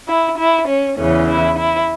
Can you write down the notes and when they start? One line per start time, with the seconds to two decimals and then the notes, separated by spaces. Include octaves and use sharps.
0.08 E4
0.38 E4
0.68 C#4
0.98 E2 C#3 E3 C#4
1.28 E4
1.59 E4